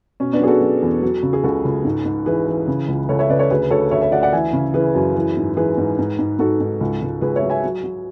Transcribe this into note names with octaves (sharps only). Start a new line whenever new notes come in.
B2 C#4
B3 D4
F#3 G#4
F#4 A4
F#3
E2
F#3
C#3
G#4
C#2 F#4 A4
C#2
G#2
G#2
E3 G#4 B4
E3
C#3
C#2
C#2 A4 C#5
C#5 E5
C#3 B4 D5
A4 C#5
D2 G#4 B4
D2 A4 C#5
D2 C#5 E5
C#5 E5
D2 D5 F#5
D5 F#5
E3 E5 G#5
C#3
E3 G#4 B4
F#2
E3
G#2
E3 G#4 B4
G#2
G#2
G#2
G#2 F#4 A4
G#2
C#2
C#2
C#2 G#4 B4
C#5 E5
F#3
E5 G#5
F#3
F#3